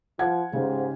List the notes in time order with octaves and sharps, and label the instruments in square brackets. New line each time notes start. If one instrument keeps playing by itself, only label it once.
[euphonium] F3 [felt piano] F#5 G#6
[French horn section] G#2 [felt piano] C#3 [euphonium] G4